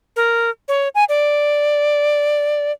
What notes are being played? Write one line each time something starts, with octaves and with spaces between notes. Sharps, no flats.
A#4
C#5
G#5
D5